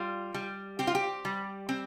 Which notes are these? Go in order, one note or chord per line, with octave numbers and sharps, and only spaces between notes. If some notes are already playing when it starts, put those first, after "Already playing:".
Already playing: G3 F4
G3
C4 G4
F4
G4
G3
C4